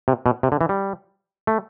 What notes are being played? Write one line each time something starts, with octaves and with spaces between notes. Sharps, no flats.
C3
B2
C3
D3
E3
G3
A3